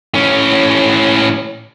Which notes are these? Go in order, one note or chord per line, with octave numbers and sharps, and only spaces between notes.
A2 C#4